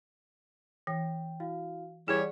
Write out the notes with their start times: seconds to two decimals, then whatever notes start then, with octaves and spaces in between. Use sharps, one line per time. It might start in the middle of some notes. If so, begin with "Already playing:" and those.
0.87 E3 G5
1.40 E4 F#4 F5
2.08 E3 G3 G#4 C#5 D5 F#5